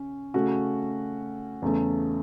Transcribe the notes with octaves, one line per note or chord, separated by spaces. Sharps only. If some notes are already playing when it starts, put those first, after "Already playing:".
Already playing: C#3 C#4
C#3 A3 C#4 F#4
E2 C#3 A3 C#4